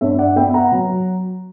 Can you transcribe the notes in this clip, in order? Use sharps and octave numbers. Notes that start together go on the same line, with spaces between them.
G2 C#5 E5
D5 F#5
B3 E5 G5
F#5 A#5
F#3